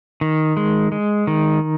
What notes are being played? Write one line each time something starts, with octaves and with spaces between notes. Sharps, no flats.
D#3
G#3
G#3
D#3